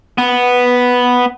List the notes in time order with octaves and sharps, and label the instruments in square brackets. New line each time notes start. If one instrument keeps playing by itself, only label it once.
[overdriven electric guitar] B3